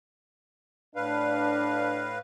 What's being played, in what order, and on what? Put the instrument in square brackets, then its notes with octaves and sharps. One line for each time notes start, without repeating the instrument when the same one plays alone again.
[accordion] A2 B4 F5 [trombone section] D4